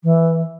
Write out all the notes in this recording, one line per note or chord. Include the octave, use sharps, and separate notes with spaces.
E3